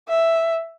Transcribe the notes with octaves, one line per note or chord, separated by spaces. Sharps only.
E5